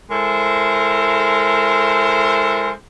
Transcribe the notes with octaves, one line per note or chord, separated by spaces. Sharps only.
G#3 E4 A4 A#4 C5